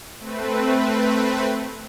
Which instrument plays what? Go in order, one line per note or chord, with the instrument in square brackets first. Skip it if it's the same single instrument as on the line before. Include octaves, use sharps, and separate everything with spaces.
[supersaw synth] A3 C4 B4